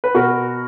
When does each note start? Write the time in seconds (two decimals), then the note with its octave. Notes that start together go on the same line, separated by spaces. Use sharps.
0.04 B4
0.15 B2 F#4 A#4